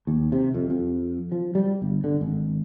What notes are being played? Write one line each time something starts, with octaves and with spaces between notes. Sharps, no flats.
D#2
C3
F2
F2
F3
G3
G1
D3
G#1